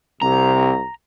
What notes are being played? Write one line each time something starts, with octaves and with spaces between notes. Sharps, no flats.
C2 C3 A#5